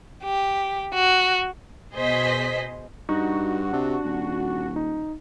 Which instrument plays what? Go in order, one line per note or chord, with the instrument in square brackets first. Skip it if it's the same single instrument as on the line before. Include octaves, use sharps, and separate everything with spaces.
[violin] G4
F#4
[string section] B2 G#4 C5 D#5 B6
[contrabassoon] G2 [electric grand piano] D#4 [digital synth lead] F#4
[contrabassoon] C3 [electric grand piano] D4
[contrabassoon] D#1
[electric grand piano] D#4